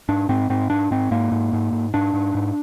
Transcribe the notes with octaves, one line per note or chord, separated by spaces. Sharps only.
G#2 D4
G#2 C4
G#2 C4
G#2 D4
G#2 C4
G#2 A#3
G#2
G#2
G#2
G#2 D4
G#2
G#2